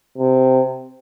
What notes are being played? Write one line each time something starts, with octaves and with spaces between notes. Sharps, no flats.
C3